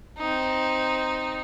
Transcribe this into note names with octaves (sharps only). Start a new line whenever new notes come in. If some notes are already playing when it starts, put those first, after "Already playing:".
C4 D#4